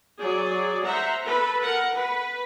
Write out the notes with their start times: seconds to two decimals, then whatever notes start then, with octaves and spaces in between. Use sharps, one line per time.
0.19 F#3 G#4 D5
0.83 C5 E5 F#5 A#5
1.25 A4 B4
1.62 A#4 F#5
1.94 B4